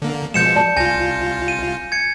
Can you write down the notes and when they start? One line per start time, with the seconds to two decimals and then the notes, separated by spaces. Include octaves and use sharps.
0.02 D3 A#3
0.34 B2 F3 G#3 G6 C#7 E7
0.56 D5 A5
0.77 C2 F4 G#5 G6 A#6
1.48 D#7
1.92 G#6 C#7